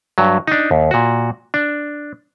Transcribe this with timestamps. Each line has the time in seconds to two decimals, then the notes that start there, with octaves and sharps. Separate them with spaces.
0.18 G2 F#3
0.47 D4 D#4
0.71 D#2
0.91 A#2 F#4
1.54 D4